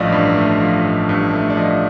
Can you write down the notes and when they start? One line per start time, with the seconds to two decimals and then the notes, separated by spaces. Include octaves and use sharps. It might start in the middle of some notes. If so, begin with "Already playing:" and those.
Already playing: A1 G2 F3 A3 D5 D#5 F5
0.12 G2
0.37 A3
0.61 F3
0.85 A1
1.09 G2
1.34 A3
1.50 D5
1.57 F3 D#5